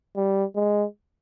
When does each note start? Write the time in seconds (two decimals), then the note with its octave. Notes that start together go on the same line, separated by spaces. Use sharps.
0.16 G3
0.56 G#3